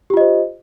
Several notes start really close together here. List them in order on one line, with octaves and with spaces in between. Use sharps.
G4 F4 D#5 C5